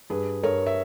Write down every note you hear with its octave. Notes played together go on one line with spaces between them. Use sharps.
G2 G#4 B4
G2 A#4 C#5
E5